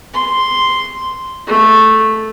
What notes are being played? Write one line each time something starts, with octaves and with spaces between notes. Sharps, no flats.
C6
A3